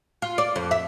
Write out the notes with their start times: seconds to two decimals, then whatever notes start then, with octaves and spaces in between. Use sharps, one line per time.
0.22 F4
0.38 D5
0.56 F2
0.71 E5